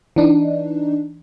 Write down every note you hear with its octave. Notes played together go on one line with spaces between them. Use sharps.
E3 D4 D#4